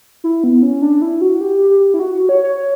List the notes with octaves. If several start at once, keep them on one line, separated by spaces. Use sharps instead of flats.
E4
B3
C#4
D4
E4
F#4
G4
G4
E4
F#4
F#4
C#5
C#5
C#5